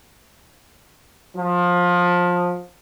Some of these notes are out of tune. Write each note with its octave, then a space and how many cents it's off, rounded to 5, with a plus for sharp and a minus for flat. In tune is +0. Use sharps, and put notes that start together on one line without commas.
F3 +20